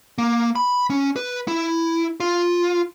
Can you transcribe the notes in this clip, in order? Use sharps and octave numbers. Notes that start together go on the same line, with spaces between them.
A#3
B5
C#4
B4
E4
F4